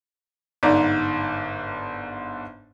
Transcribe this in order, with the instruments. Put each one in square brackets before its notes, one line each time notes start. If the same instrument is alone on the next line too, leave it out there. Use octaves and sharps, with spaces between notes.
[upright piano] G1 G#2 D5 A#5